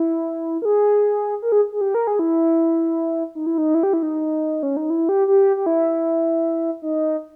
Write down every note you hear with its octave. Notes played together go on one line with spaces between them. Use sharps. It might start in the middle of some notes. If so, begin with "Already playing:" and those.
Already playing: E4
A#4
G#4
A#4
G#4
G#4
G4
A#4
G#4
E4
D#4
E4
D#4
E4
G4
E4
D#4
C#4
D#4
E4
G4
G4
G4
E4
D#4